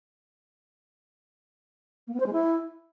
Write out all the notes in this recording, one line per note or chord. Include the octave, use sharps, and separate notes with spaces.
A#3
B3
C5
G#3
E4